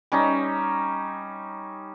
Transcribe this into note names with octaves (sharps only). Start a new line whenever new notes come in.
G3 C#4 D#4